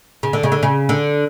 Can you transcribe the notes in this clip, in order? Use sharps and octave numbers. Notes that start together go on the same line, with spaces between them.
C#3
D3
C#3
D3
C#3
D3